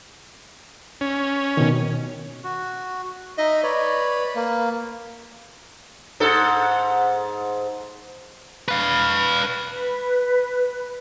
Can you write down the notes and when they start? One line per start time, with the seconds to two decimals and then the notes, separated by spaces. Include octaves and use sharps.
1.01 C#4
1.57 B2 D#3
2.44 F#4
3.38 D#4 D#5 E5
3.63 B4 C#5 D5
4.36 A#3
6.20 G#2 A4
8.68 B4 F5
9.69 B4